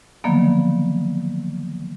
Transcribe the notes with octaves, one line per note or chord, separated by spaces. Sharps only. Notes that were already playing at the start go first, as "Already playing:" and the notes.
D3 D#3 F3 F#3 A#3 B3